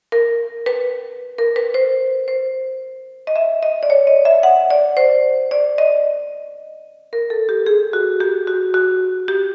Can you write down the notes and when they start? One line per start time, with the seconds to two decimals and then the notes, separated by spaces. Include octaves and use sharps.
0.12 A#4
0.66 B4
1.38 A#4
1.56 B4
1.74 C5
2.28 C5
3.27 D#5
3.36 E5
3.63 D#5
3.83 D5
3.90 C#5
4.07 D#5
4.25 E5
4.43 F#5
4.70 D5
4.97 C5
5.51 D5
5.78 D#5
7.13 A#4
7.30 A4
7.49 G4
7.66 G#4
7.93 F#4
8.20 G4
8.47 F#4
8.74 F#4
9.28 G4